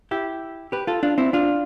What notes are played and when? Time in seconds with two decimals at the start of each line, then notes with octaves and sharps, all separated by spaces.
0.11 E4 G4
0.72 G4 B4
0.87 F4 A4
1.03 D4 F4
1.18 C4 E4
1.33 D4 F4